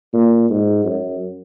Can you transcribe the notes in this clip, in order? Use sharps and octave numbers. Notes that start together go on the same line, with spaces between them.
A#2
G#2
F#2